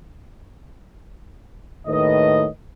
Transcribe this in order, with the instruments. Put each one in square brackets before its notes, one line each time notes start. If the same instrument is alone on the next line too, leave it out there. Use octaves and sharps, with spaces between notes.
[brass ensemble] D#2 A2 D#3 B4 D#5